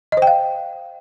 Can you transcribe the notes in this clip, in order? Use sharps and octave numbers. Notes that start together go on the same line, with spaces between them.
C5 D#5 F5 G5